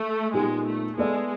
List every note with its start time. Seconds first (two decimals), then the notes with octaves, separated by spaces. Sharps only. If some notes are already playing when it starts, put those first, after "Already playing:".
Already playing: A3
0.33 A#2 G3 G#3 B3 D#4 G4
0.65 A3
0.97 G#3 B3 E4 A4 D5